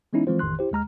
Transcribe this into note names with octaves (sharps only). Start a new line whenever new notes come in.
E3 G#3 B3 C#4 D#4 E4
E3 F3 G#3 C4 F4 C5
A1 F2 D#3 C6 F#6
E4 G4 C5
D#2 G#3 A#5 F6